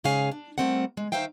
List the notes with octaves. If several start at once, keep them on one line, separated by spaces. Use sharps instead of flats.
G#2 C#3 G#4 C#5 F5 G#5
D4
G3 A3 C4 A#4 F#5
G#3
D#3 D#4 C5 E5 F5 G5